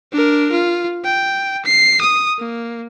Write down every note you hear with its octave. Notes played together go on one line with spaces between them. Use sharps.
D4 A#4
F4
G5
C7
D#6
A#3